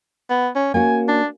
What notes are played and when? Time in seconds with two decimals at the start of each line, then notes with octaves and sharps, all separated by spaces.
0.30 B3
0.55 C#4
0.74 A#3 C#4 F#4 G#5
1.08 D4